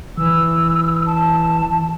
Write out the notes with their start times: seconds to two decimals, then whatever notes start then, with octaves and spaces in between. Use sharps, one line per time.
0.17 E3 E6
1.06 A5